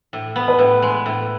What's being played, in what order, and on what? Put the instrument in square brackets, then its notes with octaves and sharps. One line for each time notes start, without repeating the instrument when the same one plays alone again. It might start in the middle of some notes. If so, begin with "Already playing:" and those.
[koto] A2
B3
[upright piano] B4
[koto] A2
G#3
A2